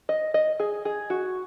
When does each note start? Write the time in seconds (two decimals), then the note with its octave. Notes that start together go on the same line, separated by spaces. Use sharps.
0.09 D#5
0.34 D#5
0.60 G#4
0.85 G#4
1.10 F#4